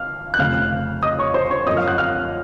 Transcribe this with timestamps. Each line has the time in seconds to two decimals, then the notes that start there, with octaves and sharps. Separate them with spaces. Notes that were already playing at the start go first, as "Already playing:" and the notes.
Already playing: F5 F6
0.34 F#6
0.39 F1 F2 C#3 F5 F6
1.03 D#5 D#6
1.18 C#5 C#6
1.34 C5 C6
1.50 C#5 C#6
1.66 F#2 F3 A#3 D#5 D#6
1.77 F5 F6
1.88 F#5 F#6
1.98 F5 F6